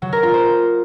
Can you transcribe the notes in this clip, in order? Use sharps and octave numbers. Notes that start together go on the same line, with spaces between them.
F#3
A#4
F4
C5